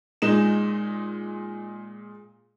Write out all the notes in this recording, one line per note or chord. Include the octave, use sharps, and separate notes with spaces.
A#2 G#3 D#4 E7